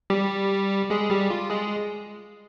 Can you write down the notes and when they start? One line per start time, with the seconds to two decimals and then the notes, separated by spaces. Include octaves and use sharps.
0.10 G3 G4
0.90 G#3 G#4
1.10 G3 G4
1.30 F4
1.50 G#3 G#4